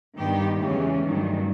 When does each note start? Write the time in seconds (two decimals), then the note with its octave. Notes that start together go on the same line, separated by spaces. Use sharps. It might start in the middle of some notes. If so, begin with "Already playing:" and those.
0.18 G2 D#3 G3 B3 G4
0.60 E2 C#3 E3 G#3 C#4
1.04 G2 D#3 F#3 A3